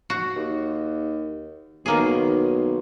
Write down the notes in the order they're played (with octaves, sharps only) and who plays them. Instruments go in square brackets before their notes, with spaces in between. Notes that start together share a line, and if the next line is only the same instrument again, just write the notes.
[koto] F#4
[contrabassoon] D#2
[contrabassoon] B1 [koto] D#3 A#3 G#4